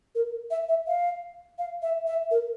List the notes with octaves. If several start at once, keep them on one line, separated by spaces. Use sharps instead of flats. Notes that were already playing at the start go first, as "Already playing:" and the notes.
A#4
E5
E5
F5
F5
E5
E5
A#4